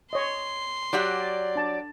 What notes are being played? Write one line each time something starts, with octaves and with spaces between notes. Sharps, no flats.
C#5 D#5 C6
F#3 G4 D5 F#5
D4 A5